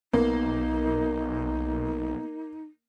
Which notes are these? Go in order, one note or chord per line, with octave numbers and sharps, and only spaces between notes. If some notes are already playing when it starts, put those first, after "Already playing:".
B1 A#3 B3 D#4